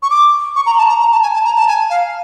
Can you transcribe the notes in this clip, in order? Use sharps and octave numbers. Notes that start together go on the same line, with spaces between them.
C#6
D6
C#6
A#5
A5
A#5
A#5
A5
G#5
A5
A#5
A5
G#5
F5